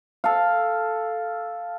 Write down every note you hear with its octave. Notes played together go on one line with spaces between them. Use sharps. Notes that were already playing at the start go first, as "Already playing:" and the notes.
A4 F5